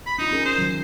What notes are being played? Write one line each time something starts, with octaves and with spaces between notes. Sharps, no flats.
B5
D4 D#4 F4
C#4 G#4 A#4
C5
D#3 F#3